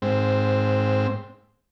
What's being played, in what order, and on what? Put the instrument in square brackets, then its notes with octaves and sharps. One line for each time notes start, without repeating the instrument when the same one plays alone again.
[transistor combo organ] G#2 C4